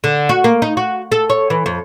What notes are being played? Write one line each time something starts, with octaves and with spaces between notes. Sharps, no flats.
D3
F#4
A#3
D#4
F#4
A4
C#5
E3
F2